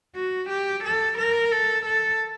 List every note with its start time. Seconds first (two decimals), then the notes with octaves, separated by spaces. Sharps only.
0.16 F#4
0.50 G4
0.84 A4
1.18 A#4
1.52 A4
1.86 A4